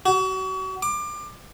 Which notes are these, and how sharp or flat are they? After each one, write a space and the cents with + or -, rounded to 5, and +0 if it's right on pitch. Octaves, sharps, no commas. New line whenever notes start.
F#4 +35
D6 +25